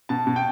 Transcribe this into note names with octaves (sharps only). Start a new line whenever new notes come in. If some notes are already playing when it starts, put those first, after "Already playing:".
B2 A5
B2
G5